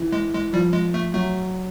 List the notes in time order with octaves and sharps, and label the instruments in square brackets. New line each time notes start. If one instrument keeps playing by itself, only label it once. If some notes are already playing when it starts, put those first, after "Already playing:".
Already playing: [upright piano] E3
[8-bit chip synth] G#3
G#3
[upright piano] F3 [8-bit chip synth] G3
[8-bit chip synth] G#3
A3
[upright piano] F#3 [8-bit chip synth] A3